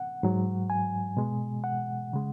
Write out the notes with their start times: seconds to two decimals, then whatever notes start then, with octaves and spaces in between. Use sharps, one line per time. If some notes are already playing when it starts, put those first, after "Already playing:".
Already playing: F#5
0.23 G#2 F#3
0.70 G#5
1.17 B2 G#3
1.64 F#5
2.13 C#3 G#3